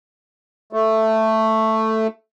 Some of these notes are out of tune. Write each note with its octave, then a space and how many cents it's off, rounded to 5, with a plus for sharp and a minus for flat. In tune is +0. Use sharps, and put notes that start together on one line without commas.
A3 +5